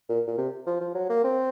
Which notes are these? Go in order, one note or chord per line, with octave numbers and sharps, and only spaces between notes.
A#2
A#2
C3
F3
F3
F#3
A#3
C4